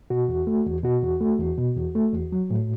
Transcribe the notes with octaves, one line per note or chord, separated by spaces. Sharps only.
B2 F#4
E2
A3
E2
B2 F#4
E2
A3
E2
B2
E2
A3
E2
F#3
A2